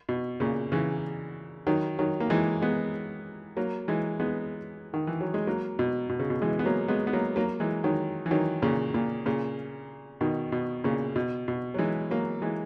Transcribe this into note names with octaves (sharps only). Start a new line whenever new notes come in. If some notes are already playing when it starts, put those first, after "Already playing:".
B2
A#2 C#3
C#3 E3
D#3 F#3
D#3 F#3
A#3
E3 G#3
G#3 B3
F#3 A#3
E3 G#3
G#3 B3
D#3
E3
F#3
G#3
F#3 A#3
B2
B2
C#3
B2
E3 G#3
B3
F#3 A#3
G#3 B3
B3
F#3 A#3
F#3 A#3
E3 G#3
D#3 F#3
E3
D#3 F#3
A#2 C#3
A#2
A#2 C#3
B2 D#3
B2
A#2 C#3
B2
B2
F#3
E3 G#3
F#3 A#3
E3 G#3